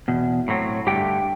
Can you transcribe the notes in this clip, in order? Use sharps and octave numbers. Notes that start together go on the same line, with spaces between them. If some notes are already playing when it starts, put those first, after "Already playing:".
E2 B2
A2 F#3 C4
G2 D3 A3 G4 G5